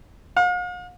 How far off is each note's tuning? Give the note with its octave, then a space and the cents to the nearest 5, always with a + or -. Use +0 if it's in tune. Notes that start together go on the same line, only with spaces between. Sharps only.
F5 +45